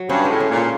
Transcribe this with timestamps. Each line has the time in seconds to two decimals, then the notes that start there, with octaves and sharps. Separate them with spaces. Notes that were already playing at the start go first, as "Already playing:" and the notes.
Already playing: F#3
0.09 G2 C#4
0.25 G#3
0.30 A2
0.40 C#4
0.51 A#2
0.56 F4